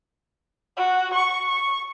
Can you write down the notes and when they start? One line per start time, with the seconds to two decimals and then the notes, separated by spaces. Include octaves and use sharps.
0.77 F#4
1.14 C#6
1.48 C#6